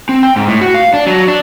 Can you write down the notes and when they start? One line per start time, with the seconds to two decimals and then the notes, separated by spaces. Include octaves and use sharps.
0.09 C4
0.23 G5
0.36 G#2
0.48 A2
0.61 F#4
0.75 F5
0.94 D4
1.07 F#3
1.28 D4